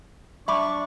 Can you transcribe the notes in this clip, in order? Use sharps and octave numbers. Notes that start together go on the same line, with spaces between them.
D4 E5 B5 C#6 D6